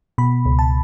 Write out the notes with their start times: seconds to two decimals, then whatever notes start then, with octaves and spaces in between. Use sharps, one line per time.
0.18 B2 B5
0.45 C#2
0.59 A5